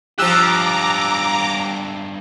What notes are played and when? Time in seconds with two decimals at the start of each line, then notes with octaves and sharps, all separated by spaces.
0.19 G2 F3 F4 G4 A#5 D6 E6 F#6